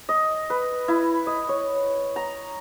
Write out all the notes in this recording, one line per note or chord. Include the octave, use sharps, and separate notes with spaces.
D#5
B4
E4
D#5
C#5
A#5